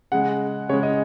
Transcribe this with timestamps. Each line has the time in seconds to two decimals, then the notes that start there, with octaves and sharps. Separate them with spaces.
0.12 C#3 G#3 F#5
0.69 C#3 G#3 C#5
0.83 D#5